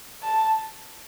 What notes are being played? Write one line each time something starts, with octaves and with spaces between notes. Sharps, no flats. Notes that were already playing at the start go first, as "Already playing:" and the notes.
A5